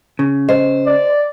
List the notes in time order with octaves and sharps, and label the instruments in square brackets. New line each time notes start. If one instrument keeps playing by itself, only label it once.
[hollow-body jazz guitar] C#3
[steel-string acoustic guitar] C5 [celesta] D#5
[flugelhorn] D5